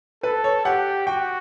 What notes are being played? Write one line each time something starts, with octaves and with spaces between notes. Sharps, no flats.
A4 B4
C#5
G4 F#5
F#4 G5